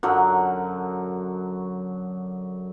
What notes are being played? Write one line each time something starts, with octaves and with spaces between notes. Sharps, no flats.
F#2 D3 F#3